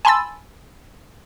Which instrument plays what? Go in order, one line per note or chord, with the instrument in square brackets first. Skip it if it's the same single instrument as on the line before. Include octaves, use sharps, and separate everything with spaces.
[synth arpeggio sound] G#5 A5 B5 C6 E6 A6